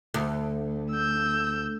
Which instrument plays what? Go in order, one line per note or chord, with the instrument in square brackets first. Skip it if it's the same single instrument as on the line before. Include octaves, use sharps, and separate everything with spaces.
[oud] D2
[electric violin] E6 G6